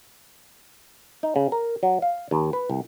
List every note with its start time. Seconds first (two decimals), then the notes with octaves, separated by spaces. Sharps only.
1.23 D#4
1.36 C#3
1.52 A#4
1.83 F#3
2.02 F5
2.31 D#2
2.53 B4
2.70 C2